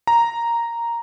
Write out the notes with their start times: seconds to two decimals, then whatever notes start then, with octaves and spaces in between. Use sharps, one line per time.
0.07 A#5